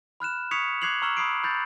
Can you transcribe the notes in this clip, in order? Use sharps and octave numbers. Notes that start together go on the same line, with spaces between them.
B5 F6 F#6 E7
C#6 D#6 G#6 B6 C#7 F7
D6 F#6 G#6 C7 F7 F#7
A#5 C#6 E6 F6 E7 F#7
B5 D#6 C7 D7
B5 G6 A6